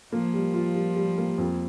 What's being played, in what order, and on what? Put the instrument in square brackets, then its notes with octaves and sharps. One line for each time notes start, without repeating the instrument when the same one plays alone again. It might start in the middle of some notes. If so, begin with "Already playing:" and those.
[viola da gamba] F3 [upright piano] A#3
[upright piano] G3
F4
G3
G3
A#3
F2